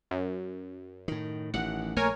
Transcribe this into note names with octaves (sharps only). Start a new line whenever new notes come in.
F#2
A2 D#3
A1 D#3 F#5
A#1 A3 A#3 A#4 C#5 G#5